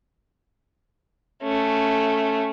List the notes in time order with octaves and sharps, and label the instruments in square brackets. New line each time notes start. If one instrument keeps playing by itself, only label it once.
[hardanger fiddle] A3 C#4